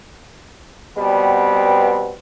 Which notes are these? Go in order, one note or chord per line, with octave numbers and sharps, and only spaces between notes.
B2 G3 B3 C4